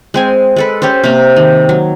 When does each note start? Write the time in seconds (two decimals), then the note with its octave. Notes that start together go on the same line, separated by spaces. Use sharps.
0.14 G#3 C4 G#5
0.56 G#3 A4 B4
0.82 C#4 G4 A4 C5
1.04 C3 A#3
1.36 D#3
1.69 F#3